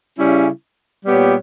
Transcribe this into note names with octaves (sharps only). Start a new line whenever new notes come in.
C#3 G3 C#4 E4
A#2 G3 B3 G4 C#5